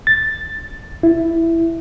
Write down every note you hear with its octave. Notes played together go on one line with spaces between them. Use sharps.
A6
E4